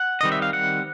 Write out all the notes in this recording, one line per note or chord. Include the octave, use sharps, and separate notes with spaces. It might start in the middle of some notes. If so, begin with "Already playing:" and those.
Already playing: F#5
D#3 G3 C4 D#5
E5
F5
F#5